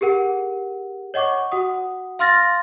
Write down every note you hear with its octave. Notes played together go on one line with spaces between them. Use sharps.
G4 G#4 A#4 F#5
C#5 D#5 F#5 C#6 D6
F#4 F#5 D#6
F5 C6 F6 A6 A#6